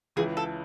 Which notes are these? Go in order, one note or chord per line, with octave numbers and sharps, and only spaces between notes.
C#2 C#3 E3 G#4
A4